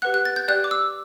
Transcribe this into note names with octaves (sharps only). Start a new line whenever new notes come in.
G4 B4 F#5 F#6
F#6
A6
G6
G4 D5 G5 F#6
D6
E6